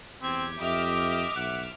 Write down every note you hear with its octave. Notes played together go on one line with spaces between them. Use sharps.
E2 C4 G4 G#6
F2 G4 D#5 E5 D6 F6
B1 F#5